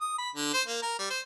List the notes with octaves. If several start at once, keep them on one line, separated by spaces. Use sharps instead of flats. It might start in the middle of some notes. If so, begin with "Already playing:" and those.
D#6
B5
D3
C5
A#3
A#4
G3
C5